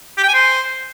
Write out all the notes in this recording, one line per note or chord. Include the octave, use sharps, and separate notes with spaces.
G4
G5
G#5
C5